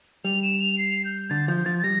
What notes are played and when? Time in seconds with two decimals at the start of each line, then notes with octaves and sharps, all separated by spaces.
0.25 G3 F7
0.43 E7
0.60 F7
0.78 C7
1.05 G6
1.30 D3 A6
1.48 F3 G6
1.66 F3 A6
1.79 A6
1.84 G3 A#6